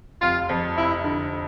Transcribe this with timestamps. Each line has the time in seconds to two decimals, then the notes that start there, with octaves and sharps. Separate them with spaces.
0.22 F1 F4
0.49 F2
0.77 F1 E4
1.04 D3